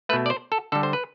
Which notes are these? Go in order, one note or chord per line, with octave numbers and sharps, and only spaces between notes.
B2 A3 B4
D5
C5
A4
D3 G3 A4
C5
B4